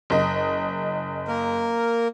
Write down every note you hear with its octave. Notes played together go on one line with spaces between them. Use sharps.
F#1 D#5
A#3 A#4